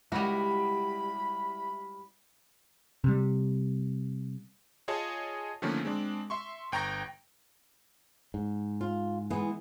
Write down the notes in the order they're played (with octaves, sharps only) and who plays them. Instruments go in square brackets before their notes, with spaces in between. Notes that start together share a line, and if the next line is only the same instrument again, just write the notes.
[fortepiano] C#2 [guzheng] G3 F#4 [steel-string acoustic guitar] E4 [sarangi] B5
[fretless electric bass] C3 G3
[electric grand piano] F4 G#4 C#5 D#5 G#5 A5
D3 D#3 F3 A3 A#3 C#4
G#3 C4 D4
E5 C6 C#6
G1 G5 A#5 C#6 A#6
[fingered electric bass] G#2
[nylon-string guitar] F4
E3 G#3 B3